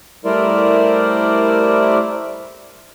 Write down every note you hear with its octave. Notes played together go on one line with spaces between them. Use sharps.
G3 A3 E4 A#4 C5 D5